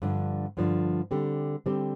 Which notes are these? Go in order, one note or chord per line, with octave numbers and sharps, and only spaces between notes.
G2 D3 F3 D4
G2 D3 F3 D4
D3 G3 C4 G4
D3 G3 C4 G4